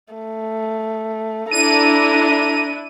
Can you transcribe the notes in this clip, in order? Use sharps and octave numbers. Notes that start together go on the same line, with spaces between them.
A3
D4 E4 A4 A#5 D#7